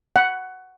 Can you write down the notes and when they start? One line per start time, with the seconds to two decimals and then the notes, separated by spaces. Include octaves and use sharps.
0.16 F#5